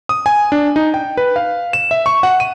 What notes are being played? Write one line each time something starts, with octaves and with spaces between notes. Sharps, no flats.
D#6
G#5
D4
D#4
G5
B4
F5
E7
E5
C#6
F#5
D#7